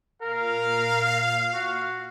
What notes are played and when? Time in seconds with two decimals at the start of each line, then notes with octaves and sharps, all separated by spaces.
0.22 A#2 A#4 F5
1.54 F#4